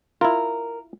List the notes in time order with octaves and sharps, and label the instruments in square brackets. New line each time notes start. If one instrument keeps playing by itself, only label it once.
[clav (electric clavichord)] E4 F4 [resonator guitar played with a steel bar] A#4